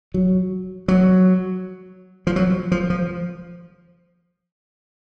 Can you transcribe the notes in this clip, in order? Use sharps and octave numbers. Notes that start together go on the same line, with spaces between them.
F#3
F#3
F3
F#3
F3
F3